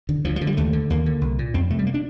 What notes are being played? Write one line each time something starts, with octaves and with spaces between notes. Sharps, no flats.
D3
D2 F3
F3
D3
G3
D#2 A3
D3
D#2 A#3
D3
C2
A#2
F2 C4
C3 A3
G3
A#3
D4